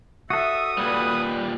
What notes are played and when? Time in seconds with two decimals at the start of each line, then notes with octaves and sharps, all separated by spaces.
0.30 F#4 A4 E5 D#6
0.78 A#2 G3 B4 B5